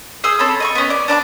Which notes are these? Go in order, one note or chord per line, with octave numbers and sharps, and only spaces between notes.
G#4 C5 D#6 E6
C4 A4 C#5 B5
D#5 A5 C#6
B3 C#4
D5
D4 D5 A#5 D6